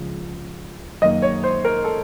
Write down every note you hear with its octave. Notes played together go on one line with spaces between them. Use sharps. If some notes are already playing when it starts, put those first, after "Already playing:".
Already playing: C#2 C#3 F3
F#2 D#3 A#3 D#5
C#5
C5
A#4
A4